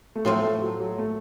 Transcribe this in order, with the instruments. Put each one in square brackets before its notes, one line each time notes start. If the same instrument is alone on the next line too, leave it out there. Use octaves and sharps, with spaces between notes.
[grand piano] A3
[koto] A2 F3 C4 [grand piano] F#3
[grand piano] A3
F#3
F#3
A3